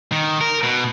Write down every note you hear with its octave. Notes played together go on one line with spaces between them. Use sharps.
D#3
A#4
B2